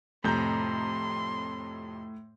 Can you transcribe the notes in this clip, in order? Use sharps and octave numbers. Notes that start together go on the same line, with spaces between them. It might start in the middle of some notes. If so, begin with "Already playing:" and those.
F2 A2 C3 A#5 C6 G6